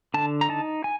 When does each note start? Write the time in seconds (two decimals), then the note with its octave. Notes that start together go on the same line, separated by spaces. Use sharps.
0.14 D3 A5
0.41 A#5
0.49 D#4 A5
0.84 G#5